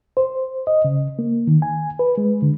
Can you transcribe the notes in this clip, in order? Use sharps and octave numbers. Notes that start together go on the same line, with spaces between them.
C5
D#5
C#3
A#3
D#3
G#5
B4
G#3
D3